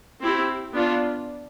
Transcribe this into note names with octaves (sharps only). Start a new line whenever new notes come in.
C4 E4 G4
B3 D4 F4